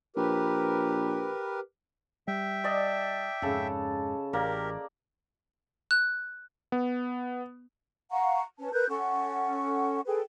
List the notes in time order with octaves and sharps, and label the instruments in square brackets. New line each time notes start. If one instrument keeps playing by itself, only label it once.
[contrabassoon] A#1 [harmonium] G4 A#4 B4
[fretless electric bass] G3 [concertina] E5 G5
[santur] D5 D#5 A5
[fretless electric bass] F2 G#2 [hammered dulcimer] C#3 A4
[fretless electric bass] A1 [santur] A#3 [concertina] G4 A#4 [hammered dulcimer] D5
[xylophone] F#6
[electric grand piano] B3
[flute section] F5 F#5 A#5 C#6
C#4 B4 A5
A#4 B4 F#6 G6
C#4 A4 F#5 C#6
G#4 A4 B4 G5